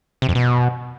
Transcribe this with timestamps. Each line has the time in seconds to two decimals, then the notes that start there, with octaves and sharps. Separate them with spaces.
0.22 C3
0.29 F2
0.35 B2